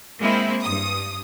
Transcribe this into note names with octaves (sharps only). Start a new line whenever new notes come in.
G#3 A#3 C4 E4
G2 D#6